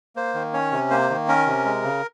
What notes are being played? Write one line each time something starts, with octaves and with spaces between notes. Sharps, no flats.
A#3 C5
D#3
C#4 C#5
C3
A#3 C5
D#3
C#4 A#4
C3
G#3
C#3